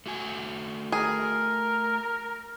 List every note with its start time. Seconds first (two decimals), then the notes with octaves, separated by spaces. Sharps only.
0.06 A3 F#4 G#5
0.92 G#4 A#4